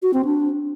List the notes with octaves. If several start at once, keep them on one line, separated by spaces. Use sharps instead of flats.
F#4
C4
D4